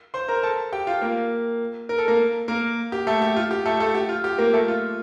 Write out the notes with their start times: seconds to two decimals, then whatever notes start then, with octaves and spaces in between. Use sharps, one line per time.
0.14 C5 C6
0.28 A#4 A#5
0.43 A4 A5
0.72 G4 G5
0.87 F4 F5
1.01 A#3 A#4
1.89 A#4
1.98 A4
2.08 A#3 A#4
2.48 A#3 A#4
2.92 G4
3.07 A3 A4
3.21 G4
3.36 F4
3.51 G4
3.65 A3 A4
3.80 A3 A4
3.95 G4
4.09 F4
4.24 G4
4.38 A#3 A#4
4.53 A3 A4
4.68 F4